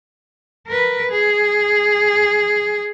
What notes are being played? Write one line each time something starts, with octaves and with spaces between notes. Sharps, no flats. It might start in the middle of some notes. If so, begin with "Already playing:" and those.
A#4 B4
G#4